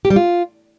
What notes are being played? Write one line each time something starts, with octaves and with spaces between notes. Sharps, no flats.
G4
G3
F4